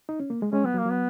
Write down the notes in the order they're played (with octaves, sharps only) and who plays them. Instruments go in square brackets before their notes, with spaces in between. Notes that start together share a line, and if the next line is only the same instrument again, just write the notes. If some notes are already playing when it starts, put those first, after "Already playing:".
[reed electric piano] D#4
C#4
A#3
G#3
[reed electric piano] G#3 [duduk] C#4
[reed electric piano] F#3 [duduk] B3
[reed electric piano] F#3
[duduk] A#3
[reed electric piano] F#3 [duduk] B3